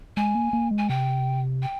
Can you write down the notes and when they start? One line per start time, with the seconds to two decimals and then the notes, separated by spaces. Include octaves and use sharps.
0.17 G#3 G#5
0.35 A#3
0.53 A#3
0.71 G#3
0.78 G#5
0.89 C3 G5
1.62 G5